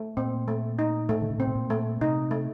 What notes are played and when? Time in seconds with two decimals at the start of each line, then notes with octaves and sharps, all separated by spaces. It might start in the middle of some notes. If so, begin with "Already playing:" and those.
Already playing: A3
0.17 A#2 C4
0.48 A3
0.79 D#4
1.09 A2 A3
1.22 D3
1.30 C#3
1.38 C3 C4
1.47 B2
1.55 A#2
1.70 A3
2.01 C3 D#4
2.31 A3